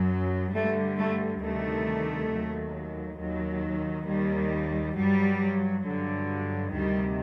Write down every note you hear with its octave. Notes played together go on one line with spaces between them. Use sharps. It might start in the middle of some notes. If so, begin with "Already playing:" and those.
Already playing: F#2 F#3
G2 D3 G3 A3
A3
D2 C3 D#3 G3 A3
D#2 D#3 F#3
D#2 D#3 F#3
D#2 D#3 G3
G2 F#3 G3
G2 D3 F#3
D2 C3 D#3 G3